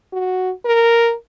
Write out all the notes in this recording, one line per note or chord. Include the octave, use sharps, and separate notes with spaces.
F#4
A#4